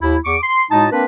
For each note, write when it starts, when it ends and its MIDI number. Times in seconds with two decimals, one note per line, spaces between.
0.01 0.16 39
0.01 0.16 64
0.25 0.36 40
0.25 0.36 85
0.25 0.36 86
0.43 0.63 84
0.70 0.86 45
0.70 0.86 56
0.70 0.86 63
0.70 0.86 66
0.70 0.86 75
0.70 0.86 81
0.91 1.04 58
0.91 1.04 60
0.91 1.04 62
0.91 1.04 70
0.91 1.04 71